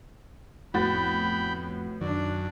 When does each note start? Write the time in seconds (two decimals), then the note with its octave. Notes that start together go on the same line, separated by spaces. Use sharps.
0.74 F2 A2 B3 F#4 B4 G5 B5 A6
2.01 F#2 D#3 D4 D5